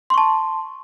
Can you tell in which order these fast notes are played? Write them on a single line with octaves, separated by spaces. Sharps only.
C6 C#6 A5